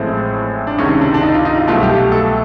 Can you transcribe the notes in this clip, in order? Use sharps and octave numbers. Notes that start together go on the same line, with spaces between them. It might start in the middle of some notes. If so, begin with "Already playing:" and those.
Already playing: A1 A2 F3 G#3 C4
D4
C#2 C3 D#3 C#4
D4
D4
D#4
F4
D#4
F4
C2 B2 F#3 A3 F4
G4
A4